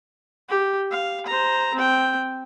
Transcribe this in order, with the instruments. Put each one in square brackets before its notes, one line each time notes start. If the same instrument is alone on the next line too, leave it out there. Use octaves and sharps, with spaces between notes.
[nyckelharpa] G4
F5
C5 A#5
C4 G5